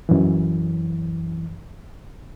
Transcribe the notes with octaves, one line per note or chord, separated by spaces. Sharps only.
F#2 E3